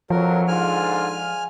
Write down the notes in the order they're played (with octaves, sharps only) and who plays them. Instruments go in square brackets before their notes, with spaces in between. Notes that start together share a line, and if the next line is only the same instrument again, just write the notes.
[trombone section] F2 F#3 [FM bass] F3 [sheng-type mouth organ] A#4
[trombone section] G#2 D3 F4 [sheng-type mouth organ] G#5 F6